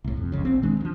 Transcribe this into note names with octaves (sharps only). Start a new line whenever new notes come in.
C2 A2
F2
F1 C#2 C#3
A#1 C4
D#3 G#3 D4
D2 F3